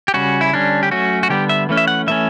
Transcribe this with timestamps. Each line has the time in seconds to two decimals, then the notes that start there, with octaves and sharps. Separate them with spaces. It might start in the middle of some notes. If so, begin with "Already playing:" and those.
0.08 G4
0.14 C#3 G3 C#4 F#4
0.41 E4
0.53 D3 G3 C#4 D4
0.83 G4
0.91 F#3 A3 C#4 F#4
1.23 F#4
1.29 D3 G3 B3 G4
1.49 E5
1.69 E3 A3 C#4
1.77 E5
1.88 F#5
2.07 E3 A3 C#4 E5